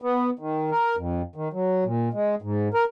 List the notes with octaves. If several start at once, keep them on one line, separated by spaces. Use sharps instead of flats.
B3
D#3
A#4
F2
D#3
F#3
A#2
G#3
G#2
A#4